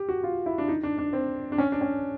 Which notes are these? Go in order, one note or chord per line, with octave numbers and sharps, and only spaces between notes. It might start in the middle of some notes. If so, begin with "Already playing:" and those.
Already playing: G4
F#4
F4
E4
D4
D#4
D4
D4
C4
D4
C#4
D4
C#4